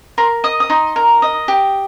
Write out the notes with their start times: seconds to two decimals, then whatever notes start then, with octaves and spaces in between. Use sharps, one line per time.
0.18 A#4 C6
0.44 D#5 D#6
0.60 D#6
0.70 D#4 C6
0.96 A#4
1.22 D#5
1.48 G4